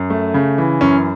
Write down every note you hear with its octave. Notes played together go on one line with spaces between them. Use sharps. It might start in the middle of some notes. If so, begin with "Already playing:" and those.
Already playing: F#2
A3
C#3
E3
F#2 C#4